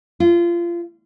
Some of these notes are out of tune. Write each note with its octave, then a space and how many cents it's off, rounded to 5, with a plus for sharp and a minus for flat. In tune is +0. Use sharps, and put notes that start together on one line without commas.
F4 -25